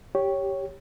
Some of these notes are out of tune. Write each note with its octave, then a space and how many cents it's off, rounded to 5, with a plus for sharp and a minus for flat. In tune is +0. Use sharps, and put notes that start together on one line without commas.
G4 +0 C#5 +0